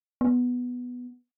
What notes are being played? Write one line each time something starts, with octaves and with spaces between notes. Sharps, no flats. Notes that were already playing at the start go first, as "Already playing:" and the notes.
B3